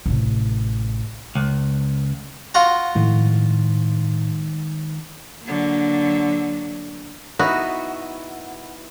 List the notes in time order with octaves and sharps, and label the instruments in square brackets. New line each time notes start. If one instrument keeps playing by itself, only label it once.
[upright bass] A1 C3
[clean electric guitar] C#2
[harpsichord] F4 F#4 A#5
[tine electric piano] A2 [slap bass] D#3 F3 G#3
[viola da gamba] D3 F#3 A#3
[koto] B3 D#4 E4 F#4